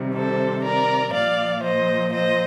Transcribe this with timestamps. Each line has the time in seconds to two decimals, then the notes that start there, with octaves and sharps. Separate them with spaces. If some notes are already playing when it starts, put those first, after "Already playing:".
Already playing: C3 D#3 G3
0.14 A4 C5
0.63 A#4 D5
1.13 A#2 F3 D5 F5
1.63 C5 D#5
2.13 C5 D#5